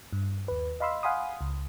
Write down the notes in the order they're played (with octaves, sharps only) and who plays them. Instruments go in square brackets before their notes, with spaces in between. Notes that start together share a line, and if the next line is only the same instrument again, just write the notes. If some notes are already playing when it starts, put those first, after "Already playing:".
[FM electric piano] G2
D#2 B4
D#5 F5 B5 C6 E6
F5 F#5 G#5 B5 C6 D#6
C#2